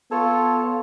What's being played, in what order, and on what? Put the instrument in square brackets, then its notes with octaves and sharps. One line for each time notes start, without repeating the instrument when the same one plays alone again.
[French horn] B3 [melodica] F4 C#5 [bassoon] A4